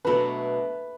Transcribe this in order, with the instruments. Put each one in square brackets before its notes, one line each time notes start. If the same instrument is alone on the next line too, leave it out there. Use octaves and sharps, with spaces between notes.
[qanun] B2 F#3 A3 D4 [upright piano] B4